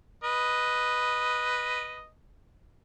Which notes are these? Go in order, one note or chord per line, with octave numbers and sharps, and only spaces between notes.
B4 D#5